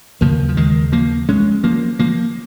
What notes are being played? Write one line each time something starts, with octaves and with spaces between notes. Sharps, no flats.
D#2 C#3 F3 A#3
F3
D#3 G#3
F3 A#3
G#3 C#4
F3 A#3
F3 A#3